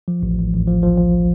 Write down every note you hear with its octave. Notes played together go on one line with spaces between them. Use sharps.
F3
A1
A1
A1
F3
F3
F3